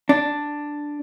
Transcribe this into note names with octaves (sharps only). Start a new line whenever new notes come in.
D4